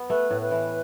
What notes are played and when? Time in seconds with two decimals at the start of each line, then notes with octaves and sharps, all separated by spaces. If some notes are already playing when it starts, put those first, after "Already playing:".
Already playing: B3
0.09 A3 B4
0.31 A2
0.42 B4
0.51 E3